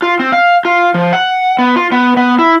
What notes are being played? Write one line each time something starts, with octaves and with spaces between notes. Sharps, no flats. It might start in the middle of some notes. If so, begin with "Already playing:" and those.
F4
C4
F5
F4
F3
F#5
B3
F4
B3
B3
E4